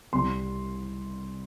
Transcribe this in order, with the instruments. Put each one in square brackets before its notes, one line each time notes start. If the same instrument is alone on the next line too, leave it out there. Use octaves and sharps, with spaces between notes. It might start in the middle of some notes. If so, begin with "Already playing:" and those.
[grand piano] C2 C3 G3 C6